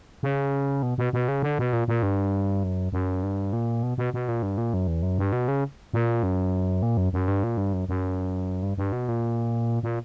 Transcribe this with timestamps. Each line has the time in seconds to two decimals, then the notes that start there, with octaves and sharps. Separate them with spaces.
0.23 C#3
0.83 B2
0.98 B2
1.13 B2
1.28 C#3
1.43 D3
1.59 B2
1.73 A#2
1.88 A#2
2.03 G2
2.63 F#2
2.93 F#2
3.23 G2
3.53 A#2
3.83 B2
3.98 B2
4.14 B2
4.28 A#2
4.43 G2
4.58 A#2
4.74 F#2
4.88 E2
5.03 F#2
5.18 G2
5.32 B2
5.48 C#3
5.94 A#2
6.23 F#2
6.82 A#2
6.97 F#2
7.13 F#2
7.28 G2
7.44 A#2
7.57 G2
7.73 F#2
7.89 F#2
8.63 G2
8.78 G2
8.93 B2
9.09 A#2
9.83 A#2